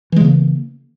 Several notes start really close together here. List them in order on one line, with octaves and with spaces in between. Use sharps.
E3 G#3 C#3 A#3